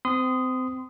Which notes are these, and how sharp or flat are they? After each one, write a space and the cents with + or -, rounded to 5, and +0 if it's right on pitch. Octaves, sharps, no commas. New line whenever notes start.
C4 -25 C6 -30 D#6 +0